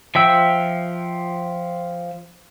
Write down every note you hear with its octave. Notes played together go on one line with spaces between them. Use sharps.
F3 E5 G5 E6